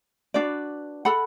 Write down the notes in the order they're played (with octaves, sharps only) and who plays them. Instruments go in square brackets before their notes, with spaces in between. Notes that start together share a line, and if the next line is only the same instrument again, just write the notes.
[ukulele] D4 F#4 B4 D5
A4 F#5 B5